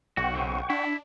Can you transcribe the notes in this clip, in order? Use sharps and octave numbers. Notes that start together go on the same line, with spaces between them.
B1 F#4 F#5 G5 C#6
C#3 C4
D4 E4